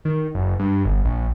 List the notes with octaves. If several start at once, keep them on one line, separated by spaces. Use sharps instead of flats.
D#3
F#1
G2
G1
A#1